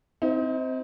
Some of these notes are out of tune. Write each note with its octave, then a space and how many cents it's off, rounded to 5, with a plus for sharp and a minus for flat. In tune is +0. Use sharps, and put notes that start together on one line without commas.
C4 -10 D#4 +35